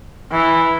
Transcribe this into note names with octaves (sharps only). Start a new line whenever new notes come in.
E3